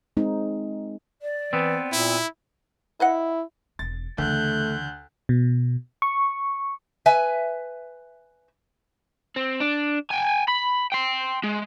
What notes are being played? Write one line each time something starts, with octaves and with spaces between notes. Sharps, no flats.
G#3 C4 D#4
D5
E3 B3 C4
A#2 E4
E4 B4 D#5 F#5
E1 A6
D2 C#3 E3 A3 F#6 G6
B2
C#6
B4 E5 G#5
C4
D4
G5 G#5
B5
G5 C6
G#3